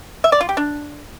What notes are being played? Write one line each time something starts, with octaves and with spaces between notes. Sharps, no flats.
E5
D5
F4
G4
D4